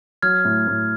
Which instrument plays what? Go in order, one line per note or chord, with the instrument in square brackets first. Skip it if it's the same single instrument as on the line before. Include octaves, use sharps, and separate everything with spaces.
[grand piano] F#3 [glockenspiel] F6 G#6
[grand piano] A2
A2